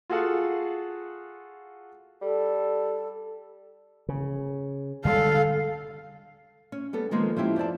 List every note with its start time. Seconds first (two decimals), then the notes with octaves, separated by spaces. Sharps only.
0.10 F4 F#4 G#4 A4 F5 F#5
2.21 G3 A4
4.09 C#3
5.05 D3 G3 G#3 A4 F5
6.72 C#4
6.93 G3 B3 A4
7.11 D#3 F3 G#3 A#3 B3
7.36 F3 C#4 E4 G4
7.56 F2 C5 D5 A5